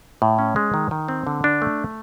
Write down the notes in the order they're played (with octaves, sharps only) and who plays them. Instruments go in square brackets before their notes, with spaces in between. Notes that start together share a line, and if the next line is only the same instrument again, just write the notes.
[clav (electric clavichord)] A2
C#4
G#3
D#3
D#3
C4
D3
D4
A3